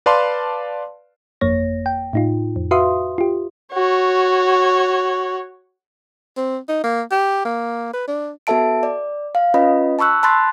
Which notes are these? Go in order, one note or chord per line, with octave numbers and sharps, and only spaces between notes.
B4 D5 F5 A5 C6
G1 F2 A#3 C#5 A#6
G5
A2 D#4 F4
F2
F#4 B4 E5 F5 C6 D#6
F4 G4
F#4 C#5
C4
D#4
A#3
G4
A#3
B4
D4
B3 F#4 A4 E5 A5 D7
D5
F5
C#4 F4 B4 D#5 B5
A5 B5 C#6 E6 F#6
A5 B5 C6 F#6 A6